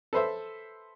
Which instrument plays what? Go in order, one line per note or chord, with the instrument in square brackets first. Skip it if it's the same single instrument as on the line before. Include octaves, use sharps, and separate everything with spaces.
[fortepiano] A4 B4 C5 E5